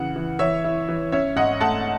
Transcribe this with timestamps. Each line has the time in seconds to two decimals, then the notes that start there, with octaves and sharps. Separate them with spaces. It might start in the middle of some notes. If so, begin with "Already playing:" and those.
Already playing: C#3 E3 F#5
0.16 E3
0.39 E3 C#5 E5
0.64 E4
0.89 E3
1.12 C#4 C#5 E5
1.36 G#2 D#5 F#5
1.61 A3 F#5 A5